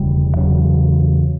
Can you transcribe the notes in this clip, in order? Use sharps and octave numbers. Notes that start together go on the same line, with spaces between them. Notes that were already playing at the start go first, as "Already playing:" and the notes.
Already playing: E1 D2 C#3 G3
E2 C#3 F#3